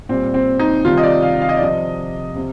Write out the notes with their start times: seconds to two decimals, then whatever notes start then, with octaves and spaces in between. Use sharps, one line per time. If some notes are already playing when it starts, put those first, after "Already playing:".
0.09 A#2 G3 C4
0.34 C4
0.59 D#4
0.84 C3 D#3 G3 F4
0.97 D#5
1.03 D5
1.22 F5
1.42 F5
1.49 D#5
1.57 D5
1.61 C3 F3 D#5
2.36 C3